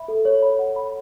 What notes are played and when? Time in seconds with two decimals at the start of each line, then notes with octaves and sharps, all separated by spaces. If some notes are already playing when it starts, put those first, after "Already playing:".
Already playing: E5 B5
0.08 A4
0.25 C#5
0.42 B5
0.59 F#5
0.76 B5